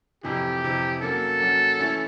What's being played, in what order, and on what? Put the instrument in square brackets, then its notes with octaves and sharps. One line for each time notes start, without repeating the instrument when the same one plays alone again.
[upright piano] F2 C3 E3 [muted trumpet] G4
[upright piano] F2 C3 E3
[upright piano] F#3 A#3 C#4 [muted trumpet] A4
[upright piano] F#3 A#3 C#4
E3 A3 C#4 E4